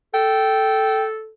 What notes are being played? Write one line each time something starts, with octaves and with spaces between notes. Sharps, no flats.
A4 G5